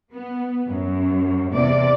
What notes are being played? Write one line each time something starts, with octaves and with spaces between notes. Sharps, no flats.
B3
F#2
E2 C3 D5